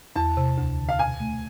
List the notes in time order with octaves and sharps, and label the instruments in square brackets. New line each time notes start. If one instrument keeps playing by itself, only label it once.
[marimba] E2 [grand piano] A5
[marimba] C3
D2
D3
[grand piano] F5
[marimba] B2 [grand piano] G#5
[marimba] A3